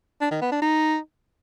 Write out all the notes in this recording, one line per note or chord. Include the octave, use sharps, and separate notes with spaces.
D4
D#3
B3
D4
D#4